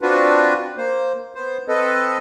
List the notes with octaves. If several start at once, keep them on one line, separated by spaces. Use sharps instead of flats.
C4 D4 F4 F#4 B4
A#3 C5
B3 C5
C4 A4 B4 D#5